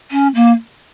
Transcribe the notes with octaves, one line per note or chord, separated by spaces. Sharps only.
C#4
A#3